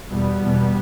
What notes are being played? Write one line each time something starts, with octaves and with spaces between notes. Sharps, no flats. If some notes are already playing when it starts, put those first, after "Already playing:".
E2 B2 G3 B3
E2 B2